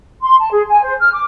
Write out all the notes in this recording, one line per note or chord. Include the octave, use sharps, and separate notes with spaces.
C6
A5
G#4
G#5
C5
F6
D6